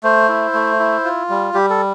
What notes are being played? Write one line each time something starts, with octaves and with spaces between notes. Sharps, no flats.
A3 C5
E4
A3
E4
F4
G3
G3 G4
A4